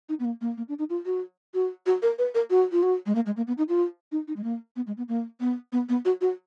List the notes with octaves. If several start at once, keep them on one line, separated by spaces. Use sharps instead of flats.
D#4
B3
A#3
A#3
A#3
D4
D#4
F4
F#4
F#4
F#4
A#4
B4
A#4
F#4
F4
F#4
G#3
A#3
G#3
A#3
B3
D#4
F4
D#4
D#4
G#3
A#3
B3
G#3
B3
A#3
B3
B3
B3
F#4
F#4